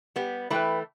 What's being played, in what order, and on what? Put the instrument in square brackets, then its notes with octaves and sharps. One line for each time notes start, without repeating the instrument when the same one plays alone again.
[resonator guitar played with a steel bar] G3 B3 [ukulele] G4
[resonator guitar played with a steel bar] E3 A3 [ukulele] B4 G5 B5